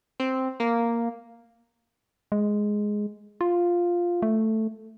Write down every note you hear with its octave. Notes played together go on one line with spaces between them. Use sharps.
C4
A#3
G#3
F4
A3